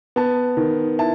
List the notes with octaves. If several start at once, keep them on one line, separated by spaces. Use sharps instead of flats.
B3 A5
D#3
E4 A5